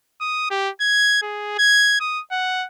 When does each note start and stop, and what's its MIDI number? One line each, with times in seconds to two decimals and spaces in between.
0.21 0.49 87
0.51 0.70 67
0.81 1.22 92
1.22 1.54 68
1.59 1.96 92
2.01 2.21 87
2.31 2.67 78